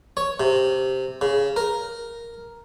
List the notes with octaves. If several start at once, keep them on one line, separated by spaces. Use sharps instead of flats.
C#5
C3
C#3
A#4